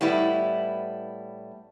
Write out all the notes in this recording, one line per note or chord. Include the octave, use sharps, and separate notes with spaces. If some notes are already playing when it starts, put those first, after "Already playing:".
A2 G3 B3 E4